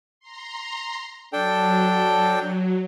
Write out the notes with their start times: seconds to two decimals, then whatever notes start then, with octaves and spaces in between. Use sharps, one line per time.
0.20 A#5 C6
1.33 F#3 D4 A4 G5